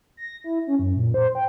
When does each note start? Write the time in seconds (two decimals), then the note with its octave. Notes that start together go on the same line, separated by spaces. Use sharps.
0.17 A#6
0.44 E4
0.67 C#4
0.79 F#2
0.96 A#2
1.14 C5
1.35 G5